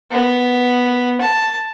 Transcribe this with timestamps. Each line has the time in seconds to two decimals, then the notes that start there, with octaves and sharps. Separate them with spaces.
0.11 B3
1.21 A5